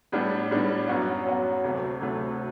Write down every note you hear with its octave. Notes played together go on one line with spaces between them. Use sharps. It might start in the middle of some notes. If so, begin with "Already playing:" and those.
A2 G3 B3 D4
A2 G3 B3 D4
F#2 F#3 B3 F#4
F#2 F#3 B3 F#4
D2 C3 F#3 A3
D2 C3 F#3 A3